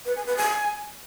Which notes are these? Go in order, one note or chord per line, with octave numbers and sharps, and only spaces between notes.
B4
G#5
B4
G#5